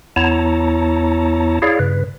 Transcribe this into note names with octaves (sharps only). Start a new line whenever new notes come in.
E2 B3 E4 C#5 A5 A#5
E4 G#4 C#5 D5 F5
G2 C#3 B4